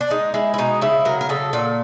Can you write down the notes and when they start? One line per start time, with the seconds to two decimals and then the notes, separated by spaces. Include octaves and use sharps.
0.01 D4
0.10 G#3 D#4
0.34 G#3 E4
0.54 E4
0.58 B2 D#4
0.82 C#3 E4
1.05 F#3 A#4
1.21 A#4
1.29 C#3 A4
1.53 A#2 A4